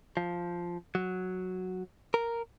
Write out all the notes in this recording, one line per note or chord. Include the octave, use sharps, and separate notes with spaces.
F3
F#3
A#4